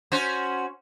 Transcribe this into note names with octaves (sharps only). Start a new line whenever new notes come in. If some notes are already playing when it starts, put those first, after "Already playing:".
C#4 F#4 C5